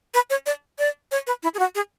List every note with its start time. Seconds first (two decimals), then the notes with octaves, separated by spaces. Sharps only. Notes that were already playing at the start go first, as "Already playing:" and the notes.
0.14 B4
0.30 C#5
0.46 D5
0.79 D5
1.11 C#5
1.27 B4
1.43 E4
1.54 G#4
1.59 F#4
1.75 G#4